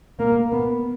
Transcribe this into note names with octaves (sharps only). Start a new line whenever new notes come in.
A#3
B3